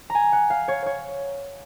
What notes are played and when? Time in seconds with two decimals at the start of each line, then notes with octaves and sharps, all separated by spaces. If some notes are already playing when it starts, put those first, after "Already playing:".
0.10 A#5
0.15 G#5
0.33 F#5
0.50 F5
0.68 C#5
0.86 C#5